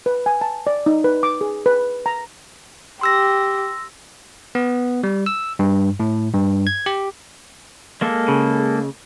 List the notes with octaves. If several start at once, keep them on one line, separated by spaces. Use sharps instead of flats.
B4
G#5
A5
D5
D#4
B4
D6
G#4
B4
A#5
G4 C6 E6 A#6
B3
G3
E6
G2
A2
G2
G#6
G4
G#3 A#3 A4
C#3